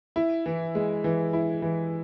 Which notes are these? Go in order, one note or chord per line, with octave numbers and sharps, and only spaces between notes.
E4
E3
G#3
E3
E4
E3